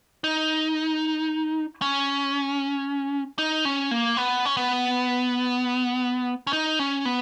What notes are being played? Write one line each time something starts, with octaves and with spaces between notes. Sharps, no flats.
D#4
C#4
D#4
C#4
A#3
B3
C#4
B3
C#4
D#4
C#4
B3